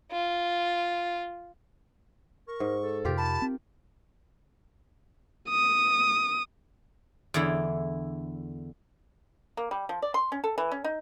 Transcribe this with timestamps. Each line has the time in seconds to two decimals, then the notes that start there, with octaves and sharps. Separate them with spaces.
0.12 F4
2.48 A#4 C#6
2.60 G#2
2.83 A4
3.05 F2 C3 F4 G4 A#4
3.17 A5 B5
3.42 C4
5.50 D#6
7.34 E2 D3 E4
9.57 A#3
9.71 G3
9.89 F3
10.02 D5
10.14 C6
10.32 C#4
10.44 A4
10.58 E3
10.72 C#4
10.84 D#4